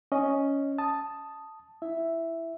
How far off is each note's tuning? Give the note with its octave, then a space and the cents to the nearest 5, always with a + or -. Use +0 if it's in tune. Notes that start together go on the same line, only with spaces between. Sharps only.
C#4 +0 D#5 +0
A5 +0 D#6 +0
E4 +10 E5 +0